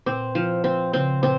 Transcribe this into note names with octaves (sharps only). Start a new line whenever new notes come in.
A#2 C4
F3
C4
C#3 C4
A#2 C4